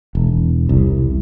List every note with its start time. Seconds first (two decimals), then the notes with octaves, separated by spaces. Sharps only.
0.15 E1
0.69 C2